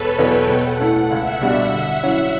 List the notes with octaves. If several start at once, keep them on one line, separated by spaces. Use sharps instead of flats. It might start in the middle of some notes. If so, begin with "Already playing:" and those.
Already playing: E1 A4 B4 C#5
E2 B2 F#3 G5
B2 F#5
A3 E4 A4
C#2 E5
B2 G3 D4 F#4
D3
F#3 C#4 E4